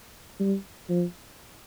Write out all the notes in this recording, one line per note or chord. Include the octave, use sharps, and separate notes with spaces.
G3
F3